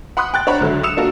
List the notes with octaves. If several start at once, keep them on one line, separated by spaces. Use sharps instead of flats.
F#5 B5 C6 D#6 F#6
G5 F#6 A6
D4 C5 C#5 F#5 A#5 B5
C#2 D3 F#3 E5
D#6 E6 C#7 E7 F7
A#3 D4 F4 F#4 A4 A#4